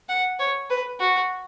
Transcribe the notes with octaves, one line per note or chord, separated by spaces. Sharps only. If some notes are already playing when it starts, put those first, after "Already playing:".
F#5
C#5
B4
F#4